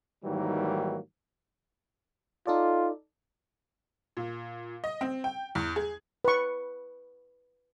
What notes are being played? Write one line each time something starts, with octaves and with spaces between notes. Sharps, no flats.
G#2 D#3 E3 F#3 G3 A#3
D#4 F4 A4 D5
A#2
D#5
C4
G5
E2
G#4
B4 C#6